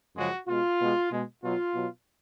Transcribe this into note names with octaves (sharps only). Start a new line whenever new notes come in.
F#2 C#3 F3 G#3 F#4
B2 G#3 F4
B2 G#3
B2 G#3
B2 F#3 F4
B2 F#3